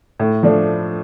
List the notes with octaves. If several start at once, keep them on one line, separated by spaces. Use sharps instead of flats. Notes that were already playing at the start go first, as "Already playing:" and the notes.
A2
F3 A3 D4